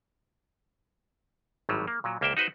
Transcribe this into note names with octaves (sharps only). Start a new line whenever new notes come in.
G#1 A2 F#3 G3
A#3
A#2 F#3
C#2 A#3 C5 E5 G5
D#4 F#4 B4 C5